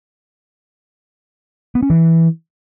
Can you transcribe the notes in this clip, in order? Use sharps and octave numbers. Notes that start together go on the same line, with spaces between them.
B3
C#4
E3